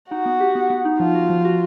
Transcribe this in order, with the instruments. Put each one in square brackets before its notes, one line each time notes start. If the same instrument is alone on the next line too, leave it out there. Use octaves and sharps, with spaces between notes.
[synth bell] D#4 [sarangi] F#4
[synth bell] B3
G4
B3
B3
D#4
[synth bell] F3 [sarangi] F4
[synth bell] F#4
F3
F#4